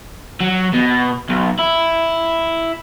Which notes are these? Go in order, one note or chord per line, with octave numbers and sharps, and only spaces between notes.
F#3
B2
B1
E4